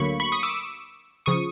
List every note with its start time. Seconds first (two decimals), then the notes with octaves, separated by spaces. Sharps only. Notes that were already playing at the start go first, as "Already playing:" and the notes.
Already playing: D2 D3 F#3 A#3 B5 C#6
0.20 B5 C#6
0.32 C#6 D#6
0.43 D6 E6
1.26 C#3 F3 C#6 D#6